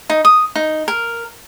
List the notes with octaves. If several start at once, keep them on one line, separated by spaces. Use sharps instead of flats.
D#4
D#6
D#4
A#4